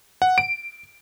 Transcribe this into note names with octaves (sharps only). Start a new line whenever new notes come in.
F#5
D7